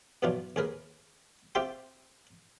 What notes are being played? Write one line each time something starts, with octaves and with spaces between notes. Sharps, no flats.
G2 B2 E3 F#3 D4 F4
D#2 G#4 A#4 B4
C4 F4 G4 E5 G5 C6